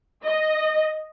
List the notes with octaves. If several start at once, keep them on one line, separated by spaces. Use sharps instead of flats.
D#5